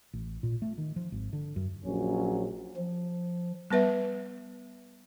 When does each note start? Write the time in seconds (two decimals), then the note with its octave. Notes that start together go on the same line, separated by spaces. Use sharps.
0.13 A1
0.43 A#2
0.62 A3
0.78 D#3
0.96 F3
1.12 G#1
1.33 D3
1.56 F#2
1.84 A#1 F#3 C#4
2.77 F3
3.70 G3 B3 B4 E5